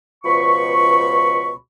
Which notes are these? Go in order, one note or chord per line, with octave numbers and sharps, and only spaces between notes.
C#2 B2 F3 B5 C#6